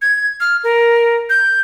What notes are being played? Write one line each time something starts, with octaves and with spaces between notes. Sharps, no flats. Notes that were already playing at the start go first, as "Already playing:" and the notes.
G#6
F6
A#4
G6